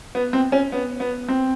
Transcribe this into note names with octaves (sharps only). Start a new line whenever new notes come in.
B3
C4
C#4
B3
B3
C4